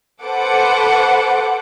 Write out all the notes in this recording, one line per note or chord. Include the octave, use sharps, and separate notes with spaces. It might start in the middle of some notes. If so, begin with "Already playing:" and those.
A4 B4 C5 F#5 D6